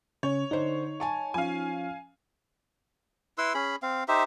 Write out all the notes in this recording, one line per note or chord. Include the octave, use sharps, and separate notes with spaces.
C#3 C#4 C#5
D3 D#4 C5
G#5 A5 C#6
F3 C#4 F5 G#5
E4 B4 C6 E6
C#4 G#4 B5
C4 F5
D#4 G4 C5 E5